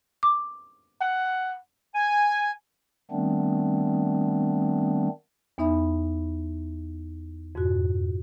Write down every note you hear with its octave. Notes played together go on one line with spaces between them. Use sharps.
D6
F#5
G#5
D#3 G3 A3 B3 C4 D4
E2 B3 D#4 E5 B5
F2 G#2 B2 F#4